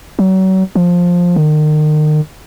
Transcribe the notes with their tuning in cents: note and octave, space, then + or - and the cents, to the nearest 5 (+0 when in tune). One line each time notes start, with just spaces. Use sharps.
F#3 +35
F3 +10
D#3 -35